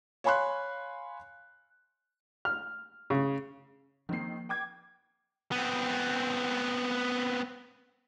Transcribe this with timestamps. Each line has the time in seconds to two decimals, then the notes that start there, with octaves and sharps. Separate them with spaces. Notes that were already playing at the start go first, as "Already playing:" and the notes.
0.24 C#5 F5 G#5 B5 C6 F#6
2.45 F6
3.10 C#3
4.09 D#3 F3 A#3 C4 C7
4.49 G5 D6 G#6
5.52 B3 C4